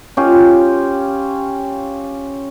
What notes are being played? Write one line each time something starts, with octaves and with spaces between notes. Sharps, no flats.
C#4 F4 G4